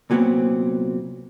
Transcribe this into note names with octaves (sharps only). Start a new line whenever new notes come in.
C2 A#2 F#3 G#3 B3 C4